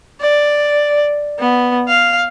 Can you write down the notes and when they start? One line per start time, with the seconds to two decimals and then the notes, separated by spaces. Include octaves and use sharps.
0.21 D5
1.39 B3
1.88 F5